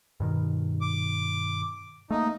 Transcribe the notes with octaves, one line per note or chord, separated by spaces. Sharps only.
G2 B2 D#3
D6
A3 A#3 D#4